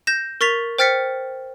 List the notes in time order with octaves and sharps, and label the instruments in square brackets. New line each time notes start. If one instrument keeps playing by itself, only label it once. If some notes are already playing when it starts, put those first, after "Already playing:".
[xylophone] G6 A#6 E7
A#4 C#6 A6 B6 F7
C5 G5 F6 A6 B6 C#7